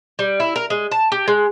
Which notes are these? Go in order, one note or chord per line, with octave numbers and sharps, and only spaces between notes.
G3
E4
A#4
G#3
A5
G4
G#3